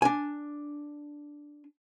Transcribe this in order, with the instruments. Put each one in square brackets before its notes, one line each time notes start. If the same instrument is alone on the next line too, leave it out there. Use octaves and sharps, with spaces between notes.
[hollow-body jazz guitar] D4 G#5